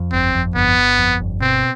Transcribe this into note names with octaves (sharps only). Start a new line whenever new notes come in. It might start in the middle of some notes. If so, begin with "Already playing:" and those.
Already playing: F2
G1 C4
F2
G1 B3
G1
F2
G1
B2 C4